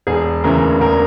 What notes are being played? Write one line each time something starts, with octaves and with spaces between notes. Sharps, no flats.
E1 G#4
D2 C#3 E3 A#4
E1 A#4